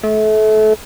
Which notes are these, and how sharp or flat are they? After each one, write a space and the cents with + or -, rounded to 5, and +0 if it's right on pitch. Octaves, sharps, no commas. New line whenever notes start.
A3 -30